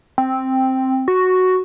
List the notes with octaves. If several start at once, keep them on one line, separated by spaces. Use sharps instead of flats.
C4
F#4